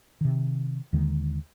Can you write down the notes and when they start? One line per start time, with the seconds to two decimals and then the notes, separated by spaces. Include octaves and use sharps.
0.21 C3 D#3
0.93 D#2 D3 D#3 G#3